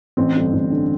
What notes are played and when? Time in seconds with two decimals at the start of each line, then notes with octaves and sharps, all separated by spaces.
0.17 A1 C4
0.36 G2 D3
0.53 A1
0.72 D3